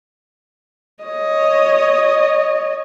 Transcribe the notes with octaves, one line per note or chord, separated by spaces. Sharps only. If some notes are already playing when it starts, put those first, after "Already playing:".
C#5 D#5